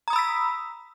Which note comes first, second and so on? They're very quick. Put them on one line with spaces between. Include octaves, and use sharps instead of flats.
A#5 D#6 B5 E6 B6